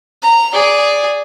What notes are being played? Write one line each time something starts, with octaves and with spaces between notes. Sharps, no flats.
A#5
G#4 D5